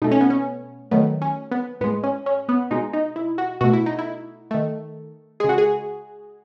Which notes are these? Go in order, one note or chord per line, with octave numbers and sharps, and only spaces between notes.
B2 A3 D#4
C#4
B3
C#4
D#3 F#3 A3 B3
C#4
B3
A2 G#3 B3
C#4
C#4
B3
B2 G#3 D#4
D#4
E4
F#4
B2 A3 F#4
E4
D#4
E4
D#3 A3
C#3 G#3 F#4 G#4
G#4